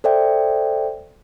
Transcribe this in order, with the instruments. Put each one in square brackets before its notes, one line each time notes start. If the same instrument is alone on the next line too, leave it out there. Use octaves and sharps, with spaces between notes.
[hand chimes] A4 C5 D5 E5 G5